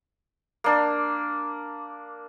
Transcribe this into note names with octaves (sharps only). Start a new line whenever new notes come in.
A#3 D4